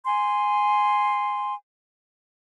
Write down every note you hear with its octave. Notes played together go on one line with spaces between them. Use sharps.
G#5 C6